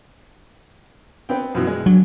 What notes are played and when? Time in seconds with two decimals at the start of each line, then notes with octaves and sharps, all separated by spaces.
1.29 B3 C4 G5
1.55 F#2 B2 E3
1.67 G#3
1.86 D3 F#3